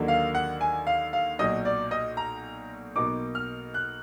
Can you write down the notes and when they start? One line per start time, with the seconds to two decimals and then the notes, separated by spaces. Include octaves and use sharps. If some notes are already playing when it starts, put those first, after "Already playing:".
Already playing: D#2 D3 F#3 A#3 D#4
0.08 F5
0.35 F#5
0.61 G#5
0.87 F5
1.13 F5
1.39 B1 A#2 F#3 D#5
1.65 D5
1.91 D#5
2.17 A#5
2.96 B1 B2 A#3 D#4 D6
3.35 F6
3.74 F#6